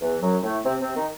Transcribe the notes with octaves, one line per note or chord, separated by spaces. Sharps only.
E2 E3
F#2 F#3
A2 A3
C3 C4
C3 C4
D#3 D#4